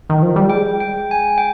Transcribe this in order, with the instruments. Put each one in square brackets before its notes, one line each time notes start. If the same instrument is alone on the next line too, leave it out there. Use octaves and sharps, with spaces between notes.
[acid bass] D#3
F3
G3
[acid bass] G#3 [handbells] G5
[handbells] G5
G#5
G5